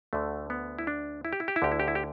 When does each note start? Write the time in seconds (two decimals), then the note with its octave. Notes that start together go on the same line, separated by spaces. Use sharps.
0.13 D2 D3 A3
0.50 B3
0.79 E4
0.87 D4
1.25 E4
1.33 G4
1.40 E4
1.48 G4
1.56 E4
1.62 D2 D3 G4
1.72 E4
1.80 G4
1.88 E4
1.95 G4